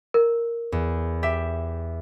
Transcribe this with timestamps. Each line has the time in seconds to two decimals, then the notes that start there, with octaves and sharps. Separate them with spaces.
0.14 A#4
0.72 E2
1.23 G4 E5